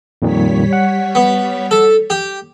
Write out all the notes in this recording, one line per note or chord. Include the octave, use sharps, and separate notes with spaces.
F2 A#2 D#3 G3 C#5 B6
F#5
B3
A4
G4